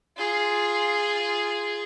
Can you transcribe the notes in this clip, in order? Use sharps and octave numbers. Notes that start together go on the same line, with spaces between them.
F4 G#4